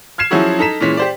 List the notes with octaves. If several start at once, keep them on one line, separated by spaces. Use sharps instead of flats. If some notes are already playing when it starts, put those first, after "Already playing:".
F6 G#6 C7 E7
F3 F#3 C#4 E4 F#4 G#4
D#4 A4 A#5 B6 E7
A#2 E3 G#3 C#4 B6
G4 C5 D5